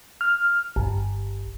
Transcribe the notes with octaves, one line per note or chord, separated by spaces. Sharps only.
F6
G1